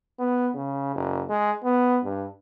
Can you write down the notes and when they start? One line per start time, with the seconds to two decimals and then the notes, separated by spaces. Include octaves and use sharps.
0.19 B3
0.54 C#3
0.95 F#1
1.29 G#3
1.63 B3
2.03 G2